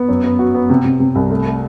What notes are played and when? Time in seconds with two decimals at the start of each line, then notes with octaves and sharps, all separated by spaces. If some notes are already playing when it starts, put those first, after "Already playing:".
Already playing: B3
0.08 F#2
0.24 B3
0.39 F#4
0.55 B3
0.70 C3
0.85 C3
1.00 C3
1.15 C2
1.31 A3
1.47 A3